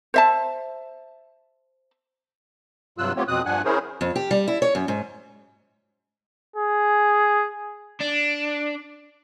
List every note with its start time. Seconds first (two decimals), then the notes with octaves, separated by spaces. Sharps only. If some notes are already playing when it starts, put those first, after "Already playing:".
0.14 C5 E5 A5
2.98 G2 C3 F#3 F4 E6 F#6
3.17 A3 B3 C4 F4 G4 C#5
3.28 F2 B2 C4 D#6 F#6
3.46 G2 F3 D4 F#5 G#5 F#6
3.65 C#4 E4 G#4 A#4 C5 C#5
4.01 F2
4.16 G4
4.31 G3
4.48 E4
4.62 C#5
4.75 F#2
4.88 G#2
6.56 G#4
8.01 D4